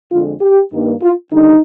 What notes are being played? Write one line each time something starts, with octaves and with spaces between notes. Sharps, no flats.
F2 D3 G#3 F4
G4
G2 D#3 A#3
F4
D#2 D3 G3 D4 D#4